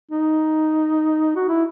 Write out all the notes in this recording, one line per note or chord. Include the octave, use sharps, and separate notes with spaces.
D#4
F#4
E4